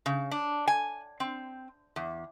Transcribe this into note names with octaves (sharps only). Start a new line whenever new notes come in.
C#3
D4
G#5
C4
E2